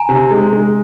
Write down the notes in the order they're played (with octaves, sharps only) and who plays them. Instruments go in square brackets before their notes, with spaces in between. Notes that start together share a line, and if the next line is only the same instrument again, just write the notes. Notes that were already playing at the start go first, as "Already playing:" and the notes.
Already playing: [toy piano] G#5 A#5
[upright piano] C3
G#3
G#3